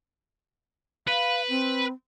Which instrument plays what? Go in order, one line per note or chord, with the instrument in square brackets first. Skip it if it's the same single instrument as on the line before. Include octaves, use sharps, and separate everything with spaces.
[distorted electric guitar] B4 [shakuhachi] F5
[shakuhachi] C4